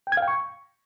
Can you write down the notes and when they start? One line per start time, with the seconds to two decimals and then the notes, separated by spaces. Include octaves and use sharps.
0.07 G5
0.12 G#6
0.17 F5
0.22 G5
0.28 C#6